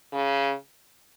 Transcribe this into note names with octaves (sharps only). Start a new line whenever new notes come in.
C#3